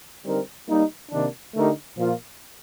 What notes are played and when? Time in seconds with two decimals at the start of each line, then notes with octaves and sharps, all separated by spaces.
0.25 D3 G3 C4 D#4 A#4
0.68 G3 A#3 D#4
1.11 C3 D#3 A#3 D4
1.55 D3 A3 D#4 G4 A#4
1.97 A#2 F3 A#3 F4